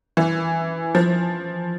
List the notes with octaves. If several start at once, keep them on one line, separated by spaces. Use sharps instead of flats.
E3
F3